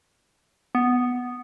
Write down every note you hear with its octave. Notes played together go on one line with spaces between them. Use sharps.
B3